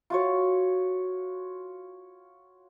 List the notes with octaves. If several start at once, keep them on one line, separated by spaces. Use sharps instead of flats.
F4 F#4 C#5